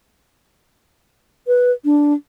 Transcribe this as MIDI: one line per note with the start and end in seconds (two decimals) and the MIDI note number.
1.47 1.72 71
1.85 2.14 62